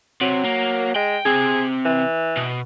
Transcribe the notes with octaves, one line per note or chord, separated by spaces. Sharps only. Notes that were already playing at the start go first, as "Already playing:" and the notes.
C3 F#3
A#3
G#3 G5
C3 C4 G#4
E3
B2